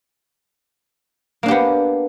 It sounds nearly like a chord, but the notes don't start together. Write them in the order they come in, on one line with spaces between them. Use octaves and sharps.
A#3 D4 G4 B3